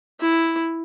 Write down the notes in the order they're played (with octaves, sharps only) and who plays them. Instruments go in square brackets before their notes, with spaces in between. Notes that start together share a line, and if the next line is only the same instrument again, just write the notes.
[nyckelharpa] E4